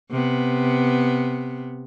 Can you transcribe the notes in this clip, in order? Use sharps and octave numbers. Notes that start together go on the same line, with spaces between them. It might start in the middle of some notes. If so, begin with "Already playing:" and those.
C3 B3